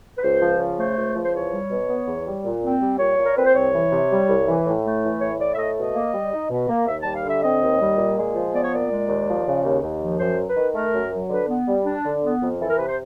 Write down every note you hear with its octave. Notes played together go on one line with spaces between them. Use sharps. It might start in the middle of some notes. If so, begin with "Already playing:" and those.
B4
C#2 C5
F3
C#3
A3 C5
C#2
F3
C5
E2 C#5
G3
B2
B3
E2
G3
A#2
C4
G3
A#2 C#5
A#2
A#4
C4 B4
C5
C2 C#5
E3
C3
G3
C2
E3
A2
A3
E3
A2 C#5
A2 D5
E5
A3 D#5
B2 D#5
A#3
G3
D#4
B2
A#3
D#2 E5
G3 A5
F5
D3
E5
C4 D#5
D#2
G3
A#2
G#3
F3
B3 D5
C#5
A#2 D5
G#3
D#2
F3
C#3
D#2
D#2
F3
F#2 C5
F#3
B4
D#3
A3 A#4
F#2
F#3
D3 B4
B3
G3
D4
D3
B3
F2
E3 A4
A#4
C3 B4
C5